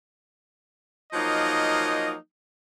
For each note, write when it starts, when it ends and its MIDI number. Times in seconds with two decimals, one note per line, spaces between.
1.13 2.13 53
1.13 2.13 54
1.13 2.13 58
1.13 2.13 63
1.13 2.13 70
1.13 2.13 75